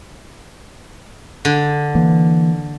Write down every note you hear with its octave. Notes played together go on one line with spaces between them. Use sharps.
D3
E3 A#3